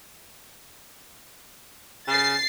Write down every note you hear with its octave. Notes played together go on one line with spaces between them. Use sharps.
C#3 A6 C7